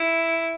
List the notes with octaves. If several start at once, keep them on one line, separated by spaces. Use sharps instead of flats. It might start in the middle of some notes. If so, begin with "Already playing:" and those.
Already playing: E4